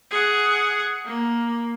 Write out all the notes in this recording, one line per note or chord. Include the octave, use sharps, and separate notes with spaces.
G#4 F#5
A#3